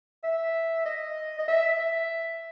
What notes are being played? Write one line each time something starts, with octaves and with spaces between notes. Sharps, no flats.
E5
D#5
D#5
E5
E5